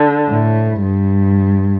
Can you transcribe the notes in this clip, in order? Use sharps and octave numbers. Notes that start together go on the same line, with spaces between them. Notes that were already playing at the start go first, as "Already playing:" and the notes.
Already playing: D3
A2
G2